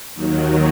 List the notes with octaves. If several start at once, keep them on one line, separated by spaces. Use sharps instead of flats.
D#2 D#3 F#3